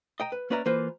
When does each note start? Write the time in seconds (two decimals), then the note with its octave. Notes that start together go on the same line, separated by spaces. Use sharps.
0.20 D#5 G5 A#5
0.32 B4
0.50 A#3 C#4 B4 D5 E5 A#5
0.66 E3 A#3 F4 B4 C5